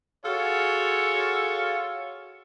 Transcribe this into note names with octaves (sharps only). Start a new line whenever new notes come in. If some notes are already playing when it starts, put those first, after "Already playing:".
F4 F#4 G#4 A4 C#5